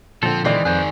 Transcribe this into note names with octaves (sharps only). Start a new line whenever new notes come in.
A#2 D3 F3 C4 A4
D#3 E3 G#3 C4 D5 C7
F2 D#3 G#4 B4 C5